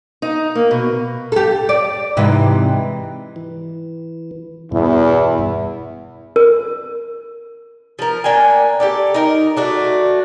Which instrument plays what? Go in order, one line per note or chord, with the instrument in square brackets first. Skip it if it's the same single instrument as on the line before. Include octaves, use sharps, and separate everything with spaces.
[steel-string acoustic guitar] D#4
A#3
B2
[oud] G4 A4
D5
G#2 C3 E3
[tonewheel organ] E3
[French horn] E2 [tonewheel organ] G2 B2 [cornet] E4
[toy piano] A#4
[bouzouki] F3 A#4
A#3 D4 G5 G#5
G4 A4 D5
D#4 A#4
A3 D4 F#4